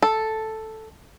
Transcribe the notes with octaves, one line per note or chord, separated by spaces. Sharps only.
A4